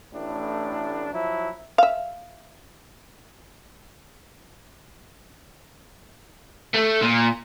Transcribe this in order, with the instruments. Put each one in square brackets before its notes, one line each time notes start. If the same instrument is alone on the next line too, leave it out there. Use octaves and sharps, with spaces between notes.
[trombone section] A1 A2 D4
F3 F#3 E4
[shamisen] E5 F5
[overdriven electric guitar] A3
A#2